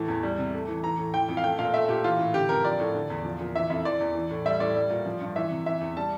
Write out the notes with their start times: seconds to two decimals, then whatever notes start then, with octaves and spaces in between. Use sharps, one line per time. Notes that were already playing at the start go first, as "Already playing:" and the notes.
Already playing: A2 E3
0.08 E2
0.23 G3
0.38 C3
0.54 A3
0.68 E3
0.84 E3 A#5
0.99 A2
1.14 E3 G5
1.29 F2
1.37 F5
1.44 A3 G5
1.59 A#2 F5
1.74 A3 E5
1.89 A#2 G4
2.04 E3 F4
2.19 A2
2.34 D3 G4
2.49 F2 A#4
2.65 F3 D5
2.80 A2
2.95 D3
3.10 E2
3.25 F3
3.40 A#2
3.55 E3 E5
3.70 F2 E5
3.85 E3 D5
4.00 E2
4.15 E3
4.31 A2
4.46 G3 E5
4.60 A2 D5
4.75 G3
4.90 A#2
5.06 F3
5.21 G2
5.36 E3 E5
5.51 C3
5.66 E3 E5
5.81 E2
5.96 G3 A5